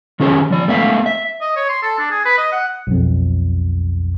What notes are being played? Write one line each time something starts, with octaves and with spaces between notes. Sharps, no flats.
D#3 F#3 C#4 F#4 G#4 C5
F3 D5
A3 B3 E5 F5
E5
D#5
C#5
C6
A4
D4
G#4
B4
D#5
F#5
B1 F2